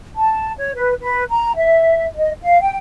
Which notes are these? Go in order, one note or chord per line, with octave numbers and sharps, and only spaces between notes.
A5
C#5
B4
B4
A#5
E5
D#5
F5
G5